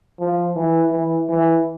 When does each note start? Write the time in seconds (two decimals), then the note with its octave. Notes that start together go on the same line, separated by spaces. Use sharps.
0.20 F3
0.56 E3
0.93 E3
1.30 E3